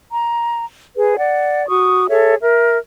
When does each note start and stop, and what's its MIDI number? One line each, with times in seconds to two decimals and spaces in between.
0.11 0.66 82
0.95 1.15 68
0.95 1.15 71
1.17 1.67 74
1.17 1.67 78
1.69 2.06 66
1.69 2.06 85
1.69 2.06 87
2.09 2.35 68
2.09 2.35 69
2.09 2.35 73
2.09 2.35 76
2.42 2.78 70
2.42 2.78 76